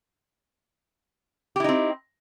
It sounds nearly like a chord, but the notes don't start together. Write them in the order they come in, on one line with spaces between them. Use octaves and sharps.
G4 E4 D#4 C4